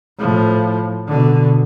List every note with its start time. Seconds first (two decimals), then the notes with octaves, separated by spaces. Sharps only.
0.18 A2 F3
1.08 B2 D3